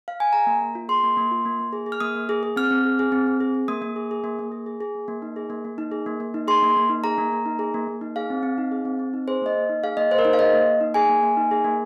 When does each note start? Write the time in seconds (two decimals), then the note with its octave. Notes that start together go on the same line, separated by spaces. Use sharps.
0.08 F5
0.20 G#5
0.33 G#4 A#5
0.47 A#3
0.62 A#3
0.75 F4
0.89 G#4 C6
1.03 A#3
1.17 A#3
1.31 F4
1.45 A#3
1.59 A#3
1.73 G#4
1.86 G#4
1.92 F6
2.00 A#3 D#6
2.15 A#3
2.29 G#4
2.43 G#4
2.56 C4 F6
2.71 C4
2.85 G#4
2.99 G#4
3.12 C4
3.27 C4
3.40 G#4
3.54 G#4
3.68 A#3 D#6
3.82 A#3
3.96 G#4
4.11 G#4
4.24 A#3
4.39 A#3
4.52 G#4
4.66 G#4
4.81 G#4
4.95 A#3
5.08 A#3
5.22 D#4
5.36 G#4
5.50 A#3
5.65 A#3
5.78 D#4
5.92 G#4
6.06 A#3
6.20 A#3
6.34 D#4
6.48 G#4 C6
6.62 A#3
6.76 A#3
6.90 D#4
7.04 G#4 A#5
7.18 A#3
7.32 A#3
7.46 D#4
7.59 G#4
7.74 A#3
7.87 A#3
8.01 D#4
8.16 G#4 F5
8.30 C4
8.43 C4
8.58 D#4
8.71 G#4
8.85 C4
8.99 C4
9.13 D#4
9.28 G#4 C5
9.42 A#3 D#5
9.55 A#3
9.69 D#4
9.83 G#4 F5
9.97 A#3 D#5
10.11 A#3 C5
10.19 A#4
10.25 D#4 C5
10.33 F5
10.39 G#4 D#5
10.53 A#3
10.67 A#3
10.81 D#4
10.94 G#4 G#5
11.09 A#3
11.23 A#3
11.37 D#4
11.51 G#4
11.64 A#3